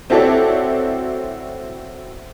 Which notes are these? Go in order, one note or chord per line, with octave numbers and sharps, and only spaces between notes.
C4 E4 F#4 A4 C#5 D5